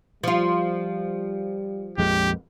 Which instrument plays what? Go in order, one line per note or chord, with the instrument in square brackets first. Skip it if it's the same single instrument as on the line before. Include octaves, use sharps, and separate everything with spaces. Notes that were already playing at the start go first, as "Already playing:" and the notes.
[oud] F3 F4 [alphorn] G3
[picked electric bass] A#1 F2 G#3 [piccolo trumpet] G4